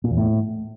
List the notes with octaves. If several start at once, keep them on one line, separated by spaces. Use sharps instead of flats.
A#2
E2
A2